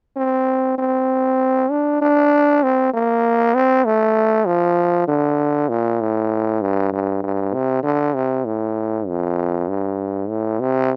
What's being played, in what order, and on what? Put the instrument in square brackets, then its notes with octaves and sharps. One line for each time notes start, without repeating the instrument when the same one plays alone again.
[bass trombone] C4
C4
D4
D4
C4
A#3
C4
A3
F3
D3
A#2
A2
G2
G2
G2
C3
D3
C3
A2
F2
G2
A2
C3